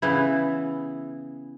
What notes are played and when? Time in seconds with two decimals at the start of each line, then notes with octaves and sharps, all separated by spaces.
0.02 C#3 E3 B3 E4